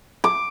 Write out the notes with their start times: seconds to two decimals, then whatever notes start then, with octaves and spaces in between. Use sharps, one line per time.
0.24 D6